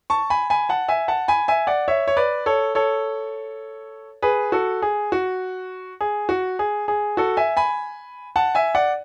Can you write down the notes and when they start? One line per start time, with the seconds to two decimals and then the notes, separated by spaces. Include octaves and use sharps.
0.10 A5 C#6
0.30 G#5 B5
0.50 G#5 B5
0.69 F#5 A5
0.88 E5 G#5
1.08 F#5 A5
1.28 G#5 B5
1.48 E5 G#5
1.67 D5 F#5
1.88 C#5 E5
2.08 C#5
2.17 B4 D5
2.46 A4 C#5
2.75 A4 C#5
4.22 G#4 B4
4.52 F#4 A4
4.82 G#4
5.12 F#4
6.01 G#4
6.29 F#4
6.59 G#4
6.88 G#4
7.17 F#4 A4
7.37 E5 G#5
7.57 G#5 B5
8.36 F#5 A5
8.55 E5 G#5
8.75 D5 F#5